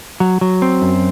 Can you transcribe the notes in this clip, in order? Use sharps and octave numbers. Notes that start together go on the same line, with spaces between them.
F#3
F#3
C4
F#2